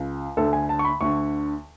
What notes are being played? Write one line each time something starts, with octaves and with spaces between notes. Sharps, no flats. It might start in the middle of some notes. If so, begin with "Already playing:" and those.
Already playing: C#2
D2 D3 A4
G#5
A5
C#6
B5
D2 D3 C#6